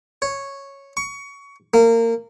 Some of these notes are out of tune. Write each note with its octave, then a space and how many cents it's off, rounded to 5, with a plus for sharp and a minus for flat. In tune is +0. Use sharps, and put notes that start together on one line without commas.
C#5 -5
C#6 +20
A#3 -25